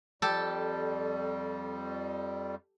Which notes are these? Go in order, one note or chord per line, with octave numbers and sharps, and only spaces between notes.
F2 G3 G4 A4